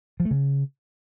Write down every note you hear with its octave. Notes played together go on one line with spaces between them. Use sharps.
F3
A3
C#3